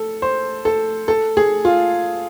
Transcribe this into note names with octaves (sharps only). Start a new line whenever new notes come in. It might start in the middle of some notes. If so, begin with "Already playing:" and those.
Already playing: A4
C5
A4
A4
G#4
F4